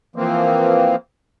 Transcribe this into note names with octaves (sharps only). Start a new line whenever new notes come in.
E3 F3 A#3 C4